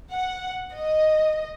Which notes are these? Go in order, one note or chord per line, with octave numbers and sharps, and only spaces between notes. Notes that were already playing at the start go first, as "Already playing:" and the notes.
F#5
D#5